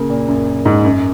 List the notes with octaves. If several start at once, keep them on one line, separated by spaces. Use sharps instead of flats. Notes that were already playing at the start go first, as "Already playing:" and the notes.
Already playing: C#3 A#3
A#2
F#2
G#2
F#2